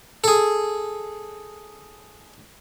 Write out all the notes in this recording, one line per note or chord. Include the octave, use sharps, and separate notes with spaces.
G#4 A4